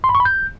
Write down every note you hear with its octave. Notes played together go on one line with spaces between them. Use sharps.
C6
B5
C#6
B5
G6